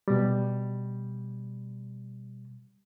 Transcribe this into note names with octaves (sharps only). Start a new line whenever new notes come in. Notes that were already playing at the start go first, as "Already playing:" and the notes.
B2 G3